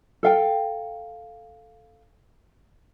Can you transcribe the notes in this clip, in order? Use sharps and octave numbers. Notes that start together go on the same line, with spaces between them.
A4 F5 G5